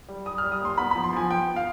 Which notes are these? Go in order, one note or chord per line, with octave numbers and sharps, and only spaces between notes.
G3
G3 D#6
F6
G3
D#6
D#2 C6
B3 B5
B5
F3
C6
F3 G#5
B3 G5
B3
F5